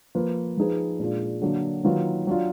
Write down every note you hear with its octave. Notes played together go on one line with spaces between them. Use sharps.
F3 A#3 F4 B4
F3 G#3 D#4 G#4 B4
A#2 G#3 D4 F4
D3 F#3 A#3
D#3 F#3 A#3 F4 B4
F#3 D4 F4